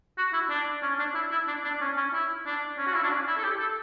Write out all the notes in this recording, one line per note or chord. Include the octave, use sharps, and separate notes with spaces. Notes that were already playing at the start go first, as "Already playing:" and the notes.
F#4
E4
D4
C#4
D4
E4
E4
D4
D4
C#4
C#4
E4
D4
C#4
F#4
E4
D4
C#4
E4
A4
G4
A4